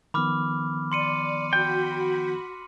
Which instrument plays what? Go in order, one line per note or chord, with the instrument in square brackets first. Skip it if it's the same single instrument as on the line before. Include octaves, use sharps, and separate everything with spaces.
[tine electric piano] D#3 F3 B3 [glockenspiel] B5 D6 F6
[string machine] D5 [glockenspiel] C6 C#7 D#7
[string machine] F#4 B5 [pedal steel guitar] G5